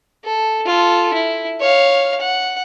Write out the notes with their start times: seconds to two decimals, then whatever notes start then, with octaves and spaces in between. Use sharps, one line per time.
0.24 A4
0.66 F4 A4
1.14 E4
1.60 C#5 F5
2.20 F#5